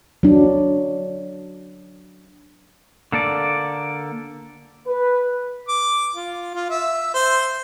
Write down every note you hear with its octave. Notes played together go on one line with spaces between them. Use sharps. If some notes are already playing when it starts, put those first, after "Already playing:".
F#3 D4
D3 A#3 A4 D5
B4
D6
F4
F4
E5
C5